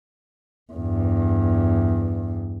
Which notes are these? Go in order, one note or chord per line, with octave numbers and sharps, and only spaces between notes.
E2 G2